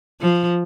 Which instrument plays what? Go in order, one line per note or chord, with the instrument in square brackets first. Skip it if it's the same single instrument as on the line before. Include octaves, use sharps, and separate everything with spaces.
[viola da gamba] F3